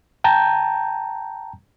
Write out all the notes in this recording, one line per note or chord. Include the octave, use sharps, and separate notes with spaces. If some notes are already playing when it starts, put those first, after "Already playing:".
G5 A5 A#5 G6